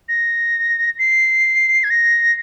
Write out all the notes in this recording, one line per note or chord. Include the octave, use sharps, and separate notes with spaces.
A#6
C7
G#6
A#6